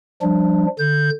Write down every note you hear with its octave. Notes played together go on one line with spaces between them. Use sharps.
F3 G3 D4
D3 G6